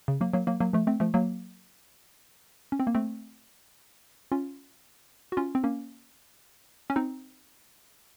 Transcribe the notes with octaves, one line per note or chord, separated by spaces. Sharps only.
C#3
F#3 A#3
F#3 A#3
F#3 A#3
F#3 A#3
F3 A3
A3 C4
F3 A3
F#3 A#3
C#4
C4
A#3
A3 C4
C#4 F4
F#4
C#4 F4
C4
A#3 C#4
C#4
C4 D#4